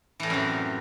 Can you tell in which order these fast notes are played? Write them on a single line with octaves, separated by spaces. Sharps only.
E3 A2 G3 F#2 C3